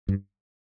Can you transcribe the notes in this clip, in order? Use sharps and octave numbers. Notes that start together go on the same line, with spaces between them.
G2